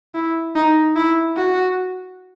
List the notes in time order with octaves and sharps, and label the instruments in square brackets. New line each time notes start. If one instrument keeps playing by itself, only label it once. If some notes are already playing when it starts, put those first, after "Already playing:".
[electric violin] E4
D#4
E4
F#4